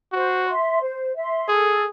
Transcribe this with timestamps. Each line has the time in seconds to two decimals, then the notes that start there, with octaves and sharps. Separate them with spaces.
0.12 F#4 C5
0.46 E5 C6
0.81 C5
1.15 E5 C6
1.48 G#4 A4